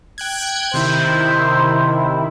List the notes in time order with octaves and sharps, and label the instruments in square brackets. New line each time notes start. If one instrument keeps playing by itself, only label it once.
[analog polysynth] G5 F#6 G#6
[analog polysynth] C3 D#3 E4 [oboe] C5